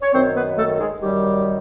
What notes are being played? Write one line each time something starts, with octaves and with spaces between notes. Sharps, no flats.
C#5
F#2 D#3 C4 C5
B3 B4
A3 A4
G#3 G#4
F#2 D#3 G3 G4